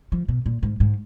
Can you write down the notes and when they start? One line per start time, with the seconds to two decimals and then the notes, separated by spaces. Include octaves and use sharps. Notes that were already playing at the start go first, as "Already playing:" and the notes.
0.12 F3
0.28 B2
0.46 A#2
0.63 G#2
0.80 G#2